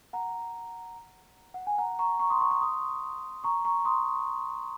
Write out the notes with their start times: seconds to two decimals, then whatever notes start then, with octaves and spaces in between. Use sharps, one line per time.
0.13 F#5 A#5
1.54 F#5
1.67 G#5
1.78 F#5 A#5
1.99 A#5 C#6
2.20 A#5 C#6
2.30 C6 D#6
2.41 A#5 C#6
2.51 A#5 C#6
2.61 C6 D#6
3.44 A#5 C#6
3.65 A#5 C#6
3.85 C6 D#6